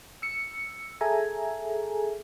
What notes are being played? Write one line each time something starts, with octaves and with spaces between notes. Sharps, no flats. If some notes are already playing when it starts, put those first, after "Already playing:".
E6 C#7
G#4 A4 E5 G#5 A#5